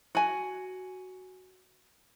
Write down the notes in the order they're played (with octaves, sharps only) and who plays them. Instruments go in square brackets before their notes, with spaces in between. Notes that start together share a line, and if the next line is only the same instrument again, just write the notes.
[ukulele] F#4 G#5